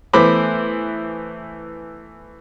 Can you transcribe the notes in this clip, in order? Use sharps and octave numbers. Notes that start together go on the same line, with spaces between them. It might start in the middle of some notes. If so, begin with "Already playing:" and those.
E3 A3 B3 C5 B5 D6